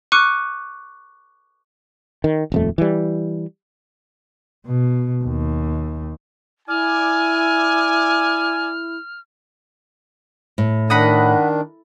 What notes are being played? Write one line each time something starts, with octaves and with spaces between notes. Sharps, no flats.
C#6 D6 F6 F#6 C#7 D#7
D#3
D#1 F2 A3
E3 G3
B2
D#2
E4 D5 G#5 F6
A2
D#3 D4 D#5 F#5 B5